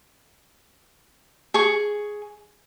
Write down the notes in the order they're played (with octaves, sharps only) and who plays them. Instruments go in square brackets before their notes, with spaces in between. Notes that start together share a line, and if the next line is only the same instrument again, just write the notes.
[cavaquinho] G#4 C#6